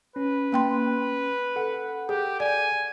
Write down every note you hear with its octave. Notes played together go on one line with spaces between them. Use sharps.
C#4 B4
A#3 G5 C6
A4 F#5
G4 G#4
D5 G#5